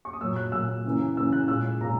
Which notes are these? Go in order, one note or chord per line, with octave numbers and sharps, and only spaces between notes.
C#6
D#6
A#2 F#3 A#3 E6
F#6
A#2 F#3 A#3 E6
C#3 E3 A#3
C#3 E3 A#3 E6
F#6
A#2 G#3 E6
A#2 G#3 A#5